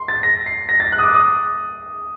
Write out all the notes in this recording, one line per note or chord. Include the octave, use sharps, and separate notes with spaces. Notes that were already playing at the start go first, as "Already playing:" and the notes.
Already playing: C6
A6
A#6
C7
A#6
A6
F#6
D#6
D6
D#6